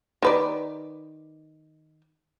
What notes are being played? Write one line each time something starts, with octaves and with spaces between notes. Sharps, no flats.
D#3 B4 D5